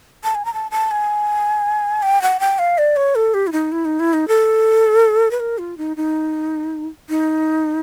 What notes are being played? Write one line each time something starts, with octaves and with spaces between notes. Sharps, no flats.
A5
G#5
A#5
A5
A5
G#5
G5
F#5
G5
F5
D5
C#5
A4
G4
E4
D#4
E4
D#4
E4
D#4
A4
B4
A#4
F4
D#4
D#4
D#4